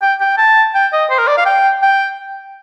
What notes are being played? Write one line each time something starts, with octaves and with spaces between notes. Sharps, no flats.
G5
G5
A5
G5
D#5
C5
A#4
D5
F5
G5
G5